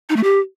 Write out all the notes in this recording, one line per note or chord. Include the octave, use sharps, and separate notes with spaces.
D#4
A3
G4